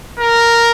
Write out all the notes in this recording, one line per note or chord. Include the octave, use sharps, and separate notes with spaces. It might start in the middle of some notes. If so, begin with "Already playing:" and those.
A#4